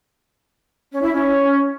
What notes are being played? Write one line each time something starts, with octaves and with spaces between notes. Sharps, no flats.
C#4
E4
C#4